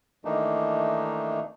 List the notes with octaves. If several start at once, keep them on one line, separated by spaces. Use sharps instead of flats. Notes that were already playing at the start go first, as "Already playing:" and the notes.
D#3 E3 A3 A#3 D4 D#4